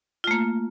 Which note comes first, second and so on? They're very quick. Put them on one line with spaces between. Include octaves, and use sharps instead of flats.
F4 A3 A#3